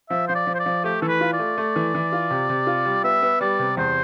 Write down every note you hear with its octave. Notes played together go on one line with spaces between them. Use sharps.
F3 E5
F3 C5
D5
F3
C5
D5
F3
A3 G4
E3 A4
B4
F4
D5
A3
A3
E3
E3
F4
C3
C3
F4
G3
B3 E5
B3
G3 D5
C3
E2 C5